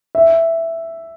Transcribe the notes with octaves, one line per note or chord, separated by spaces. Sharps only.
E5